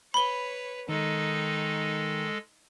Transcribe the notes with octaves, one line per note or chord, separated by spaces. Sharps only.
B4 C#5 B5 G7
D#3 G#3 D#4 A4